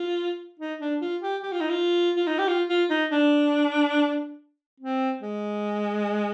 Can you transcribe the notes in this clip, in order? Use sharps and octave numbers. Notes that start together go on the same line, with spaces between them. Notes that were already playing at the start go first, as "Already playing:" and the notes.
Already playing: F4
D#4
D4
F4
G4
G4
F4
D#4
F4
F4
D#4
G4
F4
F4
D#4
D4
C4
G#3